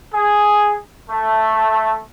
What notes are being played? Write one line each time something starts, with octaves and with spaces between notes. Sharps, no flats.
G#4
A3